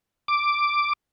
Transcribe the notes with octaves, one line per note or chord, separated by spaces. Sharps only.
D6